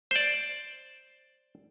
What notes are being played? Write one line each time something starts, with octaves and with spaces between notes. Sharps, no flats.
C5 D5